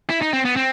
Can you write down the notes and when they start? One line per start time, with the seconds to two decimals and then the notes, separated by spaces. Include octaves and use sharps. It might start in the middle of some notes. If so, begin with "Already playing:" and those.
0.10 E4
0.22 D#4
0.33 C4
0.45 B3
0.56 C4